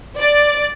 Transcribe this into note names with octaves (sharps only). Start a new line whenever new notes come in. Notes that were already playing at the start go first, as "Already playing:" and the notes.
D5